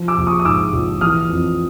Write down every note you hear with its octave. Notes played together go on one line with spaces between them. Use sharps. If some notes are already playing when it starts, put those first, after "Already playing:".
Already playing: F3
D6 E6
A#1
C#6 D#6
D#6
G#2 D6 E6
A#1
E3 D#6 F6
F2